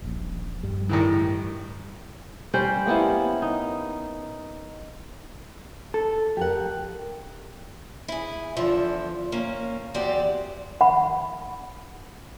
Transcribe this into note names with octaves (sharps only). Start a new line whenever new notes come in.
D#1 A#1
G2 G3
A2 D#3 E3
G3 C#4 C5 G5
A#3 B3 C#4 E4
D#4
A4
G4 A#4 F#5
E4 G#4
E2 D3 F3 E5
A#3 C#4
E2 C4 F#4 G4 D5
F#5 B5